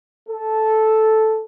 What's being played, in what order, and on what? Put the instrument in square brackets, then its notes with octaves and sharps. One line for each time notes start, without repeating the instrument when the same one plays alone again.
[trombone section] A4